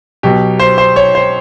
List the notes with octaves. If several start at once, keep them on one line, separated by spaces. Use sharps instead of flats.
B2 F#3 G4
C5
C5
C#5
C5